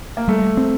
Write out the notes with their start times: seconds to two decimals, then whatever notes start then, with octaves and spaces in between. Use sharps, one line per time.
0.17 A#3
0.28 G3 A3
0.57 C4